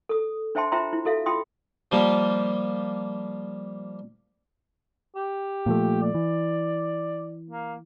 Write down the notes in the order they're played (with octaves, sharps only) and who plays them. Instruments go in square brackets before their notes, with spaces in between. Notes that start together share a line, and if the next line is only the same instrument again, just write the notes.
[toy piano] A4 D#6
D4 C5 E5 G5 A5 C6
F4 C5 E5 G5 A#5 C6
E4
F#4 A4 E5 F5
F4 G5 C6 D#6
[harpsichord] F3 G3 A#3 G4
[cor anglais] G4
[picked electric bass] A#2 F3 A3
[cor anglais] D5
[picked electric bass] E3
[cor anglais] A#3